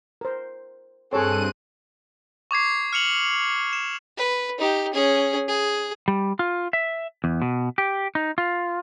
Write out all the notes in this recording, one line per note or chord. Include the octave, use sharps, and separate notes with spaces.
A#4 C5
G2 C4 G#4 A4 C#5 F#6 D#7
C#6 D6 G#6 C7
F6 C#7 F7 F#7
E7
B4
D#4 G4
C#4 G#4
G#4
G3
F4
E5
E2
B2
G4
D#4
F4